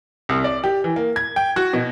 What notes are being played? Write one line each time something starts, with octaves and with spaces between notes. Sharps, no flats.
C2
D5
G4
E3
A#3
G#6
G5
F#4
B2